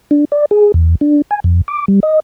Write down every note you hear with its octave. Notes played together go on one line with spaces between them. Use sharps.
D4
D5
G#4
E2
D4
G#5
F2
D6
G3
D#5